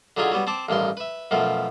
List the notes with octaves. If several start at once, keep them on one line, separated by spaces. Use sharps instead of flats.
D3 F#3 D#4 F4 G#4
F#3 G3 B3
C4 A5 D6
A1 G2 D#3 C6
B4 E5
F#2 B2 F3 A3